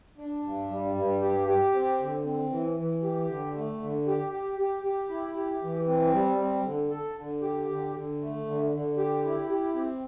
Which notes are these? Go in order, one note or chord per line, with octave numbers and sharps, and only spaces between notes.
D4
G2
G3
G2
G4
G4
C4
D3
C4
E3
E3
G4
D3
A3
D3
G4
G4
G4
G4
E4
G4
E3
C4
G3
C4
D3
A4
D3
G4
D3
D3
A3
D3
D3
G4
E4
G4
C4